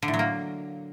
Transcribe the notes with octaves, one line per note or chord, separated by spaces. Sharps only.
D3
A2
F#3
A#3